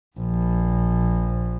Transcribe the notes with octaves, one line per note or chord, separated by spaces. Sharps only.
A#1